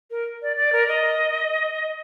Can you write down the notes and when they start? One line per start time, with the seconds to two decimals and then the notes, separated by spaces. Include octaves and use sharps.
0.11 A#4
0.42 D5
0.57 D5
0.73 A#4
0.88 D#5